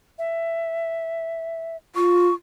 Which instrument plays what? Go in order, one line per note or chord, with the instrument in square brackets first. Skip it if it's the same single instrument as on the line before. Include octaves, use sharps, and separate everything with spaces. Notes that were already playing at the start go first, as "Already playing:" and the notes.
[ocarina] E5
[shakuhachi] F4 [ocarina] C#6